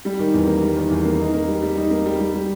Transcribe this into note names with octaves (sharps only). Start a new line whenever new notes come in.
G3
D#3
E2
A#3
G3
D#3
E2
A#3
D#4
A#3
G3
G3
D#4
A#3
G3
G3
G3